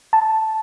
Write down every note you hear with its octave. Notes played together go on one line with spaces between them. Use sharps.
A5